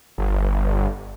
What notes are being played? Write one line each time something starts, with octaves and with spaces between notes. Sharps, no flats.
G1